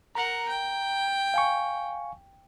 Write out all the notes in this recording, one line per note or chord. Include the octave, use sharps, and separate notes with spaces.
A#4 F#5 A#5
G5
F5 G#5 C#6